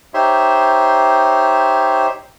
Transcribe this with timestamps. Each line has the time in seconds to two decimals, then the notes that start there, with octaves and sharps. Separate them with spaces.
0.14 D#4 G4 C5 C#5 E5 C6